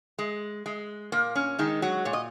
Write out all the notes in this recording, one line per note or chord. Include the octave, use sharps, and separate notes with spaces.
G#3
G#3
A#2 A#3
C#4
D#3 G#3 D#4
F#3 F#4
A#2 C#5
D#5